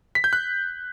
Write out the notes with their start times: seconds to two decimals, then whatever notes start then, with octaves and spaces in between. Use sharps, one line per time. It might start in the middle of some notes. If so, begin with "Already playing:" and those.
0.15 B6
0.24 G6
0.33 F#6